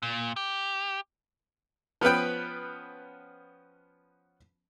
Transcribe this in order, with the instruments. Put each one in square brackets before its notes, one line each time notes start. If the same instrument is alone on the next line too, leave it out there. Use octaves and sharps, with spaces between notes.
[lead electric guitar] A#2
G4
[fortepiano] F3 B3 C#4 B4 G5